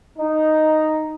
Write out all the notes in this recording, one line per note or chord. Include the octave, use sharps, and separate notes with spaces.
D#4